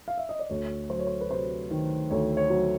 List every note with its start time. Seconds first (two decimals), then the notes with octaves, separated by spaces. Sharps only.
0.08 F5
0.18 E5
0.29 D#5
0.39 D5
0.50 D2 C#5
0.90 F#3 C5
0.99 C#5
1.07 C5
1.21 B4
1.30 C3 C5
1.71 D#3
2.10 D2 C#5
2.37 C#5
2.50 F#3